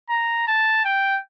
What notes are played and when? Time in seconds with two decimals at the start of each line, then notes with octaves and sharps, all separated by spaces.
0.09 A#5
0.48 A5
0.85 G5